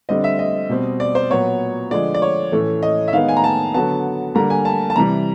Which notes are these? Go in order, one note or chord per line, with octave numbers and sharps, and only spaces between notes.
D3 G3 C4 D#5
E5
D#5
B2 G3 C4
D5
C5
A#2 F#3 B3 C#5
D3 F3 G#3 D5
D5
C#5
A2 E3 A3 C#4
D#5
E5
D#3 G#3 B3 F5
G#5
A#5
A5
D3 F#3 B3 A5
D3 G3 A#3 A#5
G#5
A5
A5
C3 E3 G3 A#5